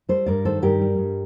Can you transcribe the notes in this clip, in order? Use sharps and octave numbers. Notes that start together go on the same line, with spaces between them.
G3 A4 C5
G2 A#4 D5
D#3 A4 C5
G2 G4 A#4
G3
G2